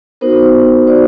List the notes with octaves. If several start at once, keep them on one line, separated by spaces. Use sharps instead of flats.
B3 D#4 F#4 A#4 C5
B3 D#4 F#4 C5 D5